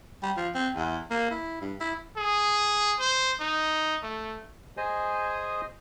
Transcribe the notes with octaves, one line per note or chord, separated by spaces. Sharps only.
G3
F3
C4
E2
A#3
E4
G2
E4
G#4
C5
D#4
A3
G#4 C5 D#5 G#5 D#6